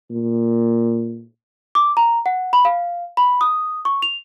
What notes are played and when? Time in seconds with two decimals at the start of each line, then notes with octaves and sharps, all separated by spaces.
0.10 A#2
1.75 D6
1.97 A#5
2.26 F#5
2.53 B5
2.65 F5
3.17 B5
3.41 D#6
3.85 C#6
4.02 F7